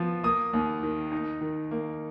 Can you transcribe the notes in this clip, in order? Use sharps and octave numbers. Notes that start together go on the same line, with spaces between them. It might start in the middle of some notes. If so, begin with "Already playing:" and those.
Already playing: F3 B3
A#3 D#6
D#2
D#3
D#4
D#3
A#3